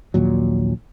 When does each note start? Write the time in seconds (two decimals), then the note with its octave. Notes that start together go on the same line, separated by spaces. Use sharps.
0.14 A#1 D#2 A#2 F#3